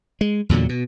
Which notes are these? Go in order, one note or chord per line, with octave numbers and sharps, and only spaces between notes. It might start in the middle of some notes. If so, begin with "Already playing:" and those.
G#3
E2 A#2 D3 F#3
B2